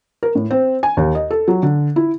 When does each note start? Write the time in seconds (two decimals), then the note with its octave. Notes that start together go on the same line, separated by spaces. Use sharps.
0.23 A#4
0.35 A2
0.51 C4
0.83 G#5
0.97 D#2
1.15 D#5
1.31 A4
1.48 F#3
1.63 D3
1.96 E4